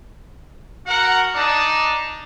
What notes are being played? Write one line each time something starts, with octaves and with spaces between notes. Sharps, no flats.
F#4 A#4 F#5
D4 D#4 D5 A5